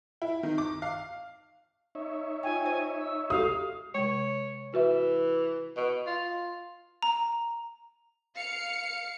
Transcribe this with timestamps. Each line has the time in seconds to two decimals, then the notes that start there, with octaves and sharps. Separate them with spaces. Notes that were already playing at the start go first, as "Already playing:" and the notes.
0.22 E4
0.43 D#3
0.58 D6
0.82 F5
1.95 D#4 C#5 E5
2.43 F4 G5 G#5
2.66 C5
2.99 E6
3.30 F#4 G4 A4 F5 D#6
3.95 C3 G#3 C#5
4.74 E3 F#4 B4 E5
5.77 B2
6.07 F4
7.03 A#5
8.36 F5 C#7